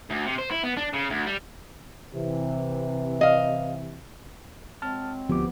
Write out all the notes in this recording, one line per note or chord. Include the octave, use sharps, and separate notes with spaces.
D2
C3
C5
E4
B3
D4
C#3
D2
G3
C3 E3
D#5 F5
F#3 G#3 C4 A5 F6
D2 F3 B3 G4 D6